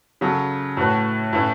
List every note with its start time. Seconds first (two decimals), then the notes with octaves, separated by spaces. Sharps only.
0.21 C#3 F#3 C#4 A4
0.77 A2 A3 F#4 B4
1.33 A2 A3 C#4 E4 B4